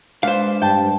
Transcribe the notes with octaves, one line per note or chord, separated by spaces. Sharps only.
G#3 D4 B4 C5 F5
G2 G5 A5